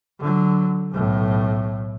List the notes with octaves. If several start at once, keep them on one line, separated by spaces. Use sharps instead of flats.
D3 F#3
B1 A2